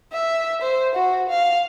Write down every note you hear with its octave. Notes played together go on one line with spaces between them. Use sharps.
E5
C5
F#4
F5